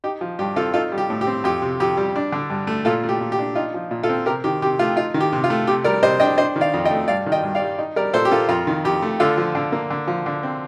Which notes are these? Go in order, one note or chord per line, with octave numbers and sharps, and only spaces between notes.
D#4 G4
F3
G2 G4
C4 F4 A4
D#4 F4 A4
G3
G4
A2
G4
C4
F2 G4
C3
F2 G4
G3
D4
D3
G2
A3
A#2 F4 A4
A3
G4
A#2
G4
D4
D#4 F4
F3
A#2
F4 A4
C4
C3 G4 A#4
D#3 G4
C3 G4
A3 F4
D#4 F4
D#3
G4
C3
F4
A3
C3 G4
G3 A#4 D5
C3 C5 D#5
D4 D#5 G5
D4 C5 D#5
D#3
D5 F5
F2
D#5 G5
A3
G2 D5 F5
D#3
D#5 G5
G2
D5 F5
G3
D#4
G3 A#4 D5
A#2 A4 C5
G4
A#3 F4 A4
F2 F4
D#3
F2 G4
A3
D3 F4 A4
F3
D3
A#3
D3
F3
D3
C4